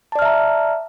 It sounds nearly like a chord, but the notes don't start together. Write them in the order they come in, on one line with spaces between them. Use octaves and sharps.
A5 D5 F6 E5 A#5